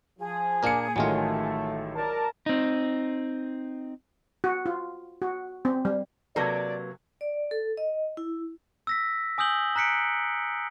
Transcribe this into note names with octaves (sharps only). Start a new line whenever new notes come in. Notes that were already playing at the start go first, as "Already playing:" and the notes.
F3 G#4
A#2 A#3 D4 A#4 C#7
A1 D#3 F#3 G#3 A3 F4
A#4 D5 A5
C4 D#4
F#4
F4
F#4
C4
G3
C3 F#3 A#3 A4 B4 D5 A#5 G#6
D5
A4
D#5
E4
E6 A#6 B6
G#5 D#6 E6 G6 F#7 G7
A#5 F#6 B6 C#7 D7